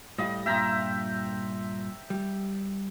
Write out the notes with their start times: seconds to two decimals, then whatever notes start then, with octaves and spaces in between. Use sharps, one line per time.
0.18 A2 G3 D#5 F5
0.46 G2 A#2 F4 E5 G5 A#5
2.10 G3